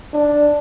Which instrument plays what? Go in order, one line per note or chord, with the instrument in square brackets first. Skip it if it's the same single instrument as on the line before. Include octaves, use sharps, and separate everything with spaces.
[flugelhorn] D4